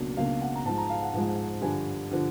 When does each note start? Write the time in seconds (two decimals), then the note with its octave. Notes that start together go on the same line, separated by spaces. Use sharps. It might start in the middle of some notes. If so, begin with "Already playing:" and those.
Already playing: C#2 B2 F#3 A#3 D4
0.17 C#2 B2 F#3 A#3 D4 F5
0.42 F#5
0.55 A#5
0.65 G#2 F3 G#3 A5
0.78 A#5
0.90 F5
1.02 F#5
1.13 G#2 F3 G#3
1.62 G2 D3 F3 G#5
2.11 D3 F3